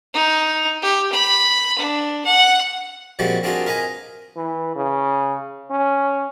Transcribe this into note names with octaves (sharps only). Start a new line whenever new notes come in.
D#4
G4
B5
D4
F#5
A#2 F3 G3 G#3 C4 F#4
C4 D4 F4 F#4 G#4 A#4
A#4 B4 D#5 G#5 A#5
E3
C#3
C#4